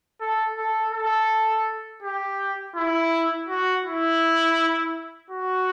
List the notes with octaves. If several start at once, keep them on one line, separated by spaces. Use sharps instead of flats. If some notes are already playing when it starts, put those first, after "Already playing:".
A4
A4
A4
G4
E4
F#4
E4
F#4